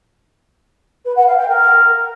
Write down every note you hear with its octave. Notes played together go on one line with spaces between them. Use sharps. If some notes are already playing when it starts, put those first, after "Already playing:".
B4
F#5
F5
G5
A#4